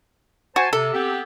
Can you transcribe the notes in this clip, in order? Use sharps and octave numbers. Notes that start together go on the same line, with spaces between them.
F#4 C5 G#5 A5
C3 A4
B3 C4 G4